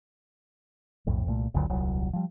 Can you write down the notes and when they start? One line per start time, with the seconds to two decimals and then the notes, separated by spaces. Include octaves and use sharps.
1.07 B1 F2 A2
1.26 C2 A#2 A3
1.54 F#1 C#2 D3 F#3
1.70 D#1 C2 F#3
2.13 F3 G3